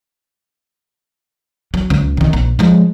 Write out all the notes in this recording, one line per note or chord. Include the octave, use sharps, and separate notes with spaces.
F#3
C#2
C3 D#3
A#1
F3 G#3